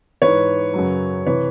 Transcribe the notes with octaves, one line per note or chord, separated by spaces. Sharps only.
G#2 E3 B4 C#5
F#2 C#3 F#3
C3 E3 B4 C#5